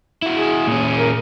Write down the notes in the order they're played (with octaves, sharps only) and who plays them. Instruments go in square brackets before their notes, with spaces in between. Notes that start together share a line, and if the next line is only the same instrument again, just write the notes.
[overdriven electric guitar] E4 F#4
[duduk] G#4
[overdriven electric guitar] A#2 C#4
[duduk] A#4